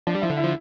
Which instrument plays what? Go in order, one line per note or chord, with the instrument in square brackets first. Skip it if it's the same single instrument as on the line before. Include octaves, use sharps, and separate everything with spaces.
[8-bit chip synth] F3 [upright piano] D4
[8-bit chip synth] G3
[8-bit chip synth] F3 [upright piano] E4
[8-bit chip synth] D3
[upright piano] E4
[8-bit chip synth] F3